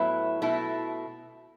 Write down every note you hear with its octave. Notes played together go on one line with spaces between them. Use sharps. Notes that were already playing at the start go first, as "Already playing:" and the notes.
Already playing: A2 F#3 B3 E4
B2 A3 E4